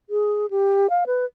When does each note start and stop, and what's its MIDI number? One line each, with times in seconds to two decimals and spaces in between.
0.10 0.46 68
0.50 0.87 67
0.90 1.04 77
1.06 1.25 71